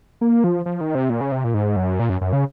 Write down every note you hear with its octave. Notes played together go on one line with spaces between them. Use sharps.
A#3
F3
F3
D#3
C3
A#2
C#3
C3
A#2
G#2
F#2
A#2
F#2
F#2
C#3